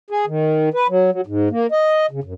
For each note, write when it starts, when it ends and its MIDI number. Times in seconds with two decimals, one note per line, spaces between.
0.10 0.25 68
0.27 0.69 51
0.74 0.87 71
0.89 1.11 54
1.12 1.21 54
1.27 1.49 44
1.50 1.67 58
1.72 2.06 75
2.11 2.20 49
2.24 2.34 42